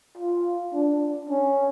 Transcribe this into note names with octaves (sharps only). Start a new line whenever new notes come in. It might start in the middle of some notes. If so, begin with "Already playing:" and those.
F4
D4
C#4